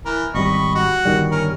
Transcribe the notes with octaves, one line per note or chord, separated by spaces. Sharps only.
E3 A#4
G#1 B2 G3 D#5 B5 C#6
F#4
G1 D#3 G3
C#4 A#4